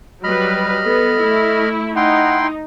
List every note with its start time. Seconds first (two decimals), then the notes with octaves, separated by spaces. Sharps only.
0.24 F#3 G3 B4 D#5 B5 F6
0.85 B3 A4
1.21 A3 E4
1.96 D#4 E4 F#5 G5 C6